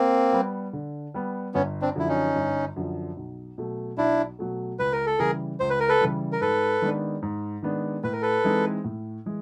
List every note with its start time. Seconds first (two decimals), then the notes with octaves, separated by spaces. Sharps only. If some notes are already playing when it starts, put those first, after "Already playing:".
Already playing: A#3 C4
0.33 G3 B3
0.73 D3
1.14 G3 B3
1.54 G1 B3 C#4
1.82 C4 D4
1.95 F#2 D3 F3 E4
2.08 C#4 D#4
2.36 G1
2.76 F#2 D3 F3
3.17 B1
3.58 B2 F#3 A3
3.97 B1 D4 E4
4.39 B2 F#3 A3
4.79 C#2 B4
4.92 A#4
5.06 A4
5.19 C#3 E3 G3 G#4 A#4
5.60 C#2 C5
5.70 B4
5.80 A#4
5.89 A4 B4
6.01 C#3 E3 G3
6.33 A#4
6.41 G#2 A4 B4
6.82 D#3 G#3 B3 D4
7.22 G#2
7.63 D#3 G#3 B3 D4
8.04 A2 B4
8.13 A#4
8.22 A4 B4
8.44 E3 G#3 C4 D#4
8.84 A2
9.26 E3 G#3